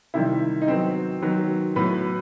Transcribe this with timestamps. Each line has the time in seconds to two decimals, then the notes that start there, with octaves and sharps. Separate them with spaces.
0.14 C3 D#3 G3 E4
0.62 D#4
0.68 D#3 F#3 B3 C4
1.22 D#3 F#3 B3
1.76 A2 F#3 B3 B4